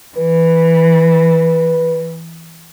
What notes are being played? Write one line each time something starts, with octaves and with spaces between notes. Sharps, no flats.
E3 B4